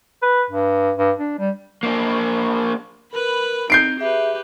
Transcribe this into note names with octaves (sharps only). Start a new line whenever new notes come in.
B4
G2
G2
D4
G3
A#3 D4
A#4 B4 B5
C4 D#4 G6 C7 D7
G4 G#4 B4 E5